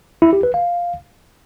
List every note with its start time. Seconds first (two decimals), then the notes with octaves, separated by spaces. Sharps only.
0.22 E4
0.33 G4
0.43 B4
0.54 F5